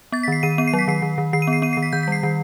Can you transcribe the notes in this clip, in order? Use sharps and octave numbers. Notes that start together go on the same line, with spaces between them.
B3 A6
B6
D#3 C7
D#3 D#7
B3 D#7
C7
F#3
B6
D#3 C7
D#3
D#3
D#3 C7
D#7
B3
C7
B3 D#7
C7
D#3
B6
D#3 G6
B6
G3 C7
D#3